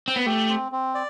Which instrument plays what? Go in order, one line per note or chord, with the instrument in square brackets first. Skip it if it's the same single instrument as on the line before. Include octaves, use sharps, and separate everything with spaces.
[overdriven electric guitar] C4
B3
[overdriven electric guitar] A3 [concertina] G4
[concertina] C4
C4
D5